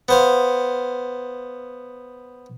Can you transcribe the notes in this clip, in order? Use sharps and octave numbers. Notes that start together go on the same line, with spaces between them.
B3 C5 F5